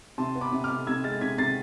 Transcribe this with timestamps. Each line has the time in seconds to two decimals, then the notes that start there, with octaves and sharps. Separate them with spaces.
0.18 C3 A5 C6
0.35 B3
0.41 B5 D6
0.52 C3
0.64 D6 F6
0.70 C3
0.87 C3 E6 G#6
1.04 G#3 F6 A6
1.21 C3 G#6 B6
1.38 C3 A6 C7